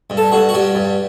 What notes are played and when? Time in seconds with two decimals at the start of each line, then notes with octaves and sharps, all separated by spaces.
0.10 G2
0.17 A4
0.32 G2 F#4
0.49 F#4
0.54 G2 G4
0.75 G2